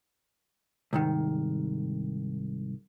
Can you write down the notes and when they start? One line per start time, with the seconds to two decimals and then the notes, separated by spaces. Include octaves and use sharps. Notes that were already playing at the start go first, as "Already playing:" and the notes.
0.93 C2 G#2 D#3